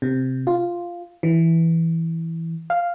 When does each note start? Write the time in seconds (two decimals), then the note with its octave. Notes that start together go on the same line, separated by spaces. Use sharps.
0.02 C3
0.47 F4
1.23 E3
2.70 F5